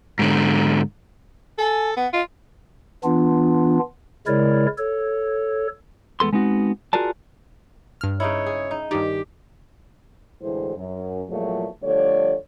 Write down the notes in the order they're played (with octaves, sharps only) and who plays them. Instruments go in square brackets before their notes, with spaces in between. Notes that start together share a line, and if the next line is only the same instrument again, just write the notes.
[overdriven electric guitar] G#2 D3
[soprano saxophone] A4 [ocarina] G#5
[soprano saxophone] B3 [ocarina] F#5
[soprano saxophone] F4 [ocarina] D#5
[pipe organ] E3 B3 D4 F4
C#3 G#3 E4 A#4 C#5 D5
A4 C#5
[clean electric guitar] E2 G#3 B3 A4 C6
G#3 B3 C4 D#4 F#4
F4 F#4 G#4 A#4 D5 A5
[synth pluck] G2 F6
[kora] C#3 D#4 E4 [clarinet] C#5
[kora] G#4
D#4
[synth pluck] G2 D#3 D#4 [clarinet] G4 [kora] D5
[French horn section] D2 A2 E3 G#3 E4 C5
F#2
E2 A#2 F3 F#3 G#3 A3
D3 F3 G3 A3 C#5 D5